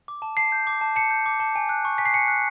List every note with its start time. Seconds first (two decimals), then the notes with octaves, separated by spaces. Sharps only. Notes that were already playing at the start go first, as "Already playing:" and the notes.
0.08 D6
0.22 A5
0.37 A5 C7
0.52 G6
0.67 D6
0.81 A5
0.96 A5 C#7
1.11 G6
1.26 D6
1.40 A5
1.55 G#5
1.69 F#6
1.85 C#6
1.98 G#5 B6
2.05 C7
2.14 G#5 C#7
2.28 F#6